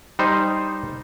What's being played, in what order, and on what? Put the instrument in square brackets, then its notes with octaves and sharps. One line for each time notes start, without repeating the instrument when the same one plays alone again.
[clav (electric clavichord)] G3 D#4 C5